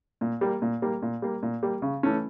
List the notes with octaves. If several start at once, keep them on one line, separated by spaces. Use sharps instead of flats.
A#2
G3 A#3
A#2
G3 A#3
A#2
G3 A#3
A#2
G3 A#3
C#3
E3 A3 C#4